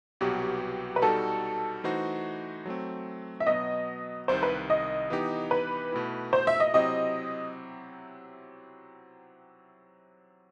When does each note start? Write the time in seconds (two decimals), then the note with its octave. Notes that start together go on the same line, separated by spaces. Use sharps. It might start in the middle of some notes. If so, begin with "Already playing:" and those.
0.21 C2 B2 F#3 B3 F#4 G4
0.96 B4
1.02 B2 G3 D#4 F#4 A4
1.83 E3 A3 D#4 F#4 C5
2.66 F#3 A3 C4
3.40 E5
3.47 B2 F#3 B3 D#5
4.28 C2 C3 D#3 C5
4.43 B4
4.70 D#5
5.10 E3 B3 D#4 G4
5.51 B4
5.92 B2 A3 E4
6.33 C5
6.47 E5
6.60 D#5
6.74 C3 F#3 C4 E4 G4 D#5